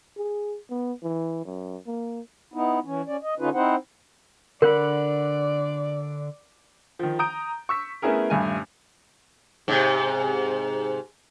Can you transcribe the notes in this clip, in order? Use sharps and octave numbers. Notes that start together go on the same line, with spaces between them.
G#4
B3
E3
F#2
A#3
B3 D#4 E4
E3 C#4
C#4 D5
D#5
D3 C#4 D#4 F4 B4
C4 D#4 E4 C5 F#5
D3 A#4 D5 F#5 B5
D#3 F3
A#5 D#6 G6 D7
C#6 E6 B6
A3 B3 C#4 E4 G#4 A#4
D#1 G2 A3 G#5
G#2 C3